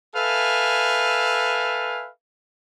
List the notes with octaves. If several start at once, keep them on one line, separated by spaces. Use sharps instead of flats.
A4 B4 E5 F5 G#5